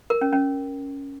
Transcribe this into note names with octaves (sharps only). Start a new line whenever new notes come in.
A#4
C#4
C#4